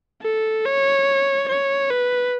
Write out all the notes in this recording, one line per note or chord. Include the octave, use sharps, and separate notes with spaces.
A4
C#5
C#5
B4